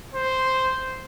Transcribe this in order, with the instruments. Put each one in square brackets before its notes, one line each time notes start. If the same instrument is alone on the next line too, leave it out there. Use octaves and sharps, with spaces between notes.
[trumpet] C5